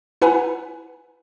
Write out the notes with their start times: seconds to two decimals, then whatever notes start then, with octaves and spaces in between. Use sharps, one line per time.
0.22 E4 B4 F#5 G#5 A#5